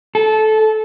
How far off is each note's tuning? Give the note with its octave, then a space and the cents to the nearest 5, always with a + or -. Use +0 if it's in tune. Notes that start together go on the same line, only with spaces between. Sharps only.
A4 -20